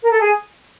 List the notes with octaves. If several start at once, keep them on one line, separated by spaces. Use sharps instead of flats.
A#4
A4
G#4